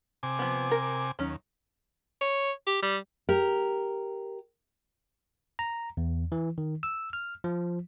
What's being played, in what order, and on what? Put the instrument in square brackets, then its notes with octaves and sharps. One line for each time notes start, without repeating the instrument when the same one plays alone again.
[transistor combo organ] C3 G#5 D6
[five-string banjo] F3 B3
A#4
[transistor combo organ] D#2 [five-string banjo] F#3 C#4
[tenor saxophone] C#5
G4
G3
[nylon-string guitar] G4 A#4
[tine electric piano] A#5
E2
E3
D#3
E6
F6
F3